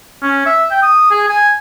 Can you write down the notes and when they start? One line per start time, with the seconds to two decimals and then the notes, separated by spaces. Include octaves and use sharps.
0.23 C#4
0.46 E5
0.71 G5
0.83 D#6
1.11 G#4
1.28 G#5